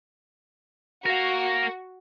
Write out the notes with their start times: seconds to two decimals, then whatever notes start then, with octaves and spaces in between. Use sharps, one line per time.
1.06 F#4 A#4 F5